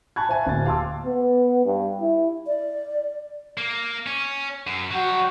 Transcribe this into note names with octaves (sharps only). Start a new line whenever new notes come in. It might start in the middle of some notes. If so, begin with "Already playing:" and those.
G#5 A5 B5 C#6 F#6 G#6
C5 E5 F5 G#5 A5
D1 A#3 A6
G4 F5 A5 C6 D6 E6
B3
G2
E4
D5
A#3
C#4
F#2
F#3 F#4 G5